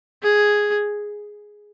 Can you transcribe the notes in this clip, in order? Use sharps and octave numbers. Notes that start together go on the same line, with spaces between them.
G#4